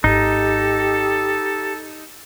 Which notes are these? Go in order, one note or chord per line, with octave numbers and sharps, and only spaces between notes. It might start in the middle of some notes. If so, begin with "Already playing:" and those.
G#1 G#2 D#4 G4 A4